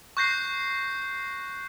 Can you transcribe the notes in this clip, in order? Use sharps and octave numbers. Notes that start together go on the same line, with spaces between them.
C#6 F#6 G6 A#6 C7